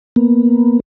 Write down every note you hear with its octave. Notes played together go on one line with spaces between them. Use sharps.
A#3 B3